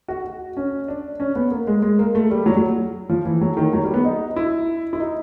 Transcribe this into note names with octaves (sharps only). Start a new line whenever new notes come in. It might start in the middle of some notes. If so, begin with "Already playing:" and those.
F#4
F#4
C#4
D4
C#4
B3
A#3
G#3
G#3
A#3
A3
G3
F#3
F#3
F3
E3
F#3
D#3
F#3
G3
B3
D#4
E4
E4
D#4